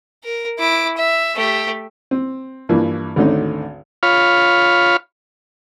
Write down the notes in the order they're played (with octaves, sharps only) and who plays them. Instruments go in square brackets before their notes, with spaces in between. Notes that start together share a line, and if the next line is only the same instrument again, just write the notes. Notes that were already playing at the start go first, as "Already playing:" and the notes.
[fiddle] A#4
E4 D6
E5
A3 G4
[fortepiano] C4
G2 E3 F3 A#3
G#1 D2 D3 C4 C#4 D#4
[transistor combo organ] F4 C#5 F5 B5